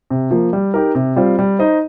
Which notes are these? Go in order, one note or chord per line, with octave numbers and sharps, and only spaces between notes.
C3
F3 A#3
G3
D#4 G4 A#4
C3
G3 C4 F4 C5
G3
D#4 C5 D#5